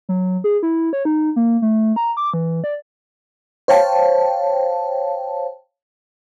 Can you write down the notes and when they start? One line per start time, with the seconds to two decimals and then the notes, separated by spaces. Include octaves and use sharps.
0.09 F#3
0.44 G#4
0.63 E4
0.93 C#5
1.05 D#4
1.36 A#3
1.62 A3
1.96 A#5
2.17 D6
2.34 E3
2.64 D5
3.68 C5 C#5 F5 G5 A5